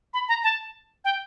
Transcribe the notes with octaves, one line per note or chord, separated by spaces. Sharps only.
B5
A#5
A5
G5